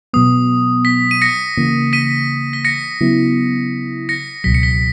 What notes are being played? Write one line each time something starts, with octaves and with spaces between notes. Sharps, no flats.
B2 F#3 B3 D#6
B6
D#7
A#6 C#7
C#3 E3 A#3
B6 D#7
B6
A#6 C#7
C#3 F#3 B3 E4
A#6 C#7
C#2 B2 F#3 B6
C#7
B6